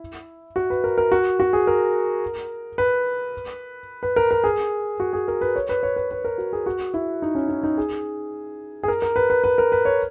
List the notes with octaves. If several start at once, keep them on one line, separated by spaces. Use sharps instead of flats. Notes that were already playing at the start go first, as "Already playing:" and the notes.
Already playing: E4
F#4
B4
A#4
A#4
F#4
F#4
G#4
A#4
B4
B4
A#4
A#4
G#4
F#4
G#4
A#4
B4
C#5
B4
C#5
B4
B4
A#4
F#4
G#4
F#4
E4
D#4
C#4
C#4
D#4
G#4
G#4
A#4
A#4
B4
B4
B4
A#4
B4
C#5